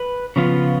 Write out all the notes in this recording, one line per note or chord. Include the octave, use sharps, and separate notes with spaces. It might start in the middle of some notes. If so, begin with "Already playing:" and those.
Already playing: B4
C#3 F3 B3 F4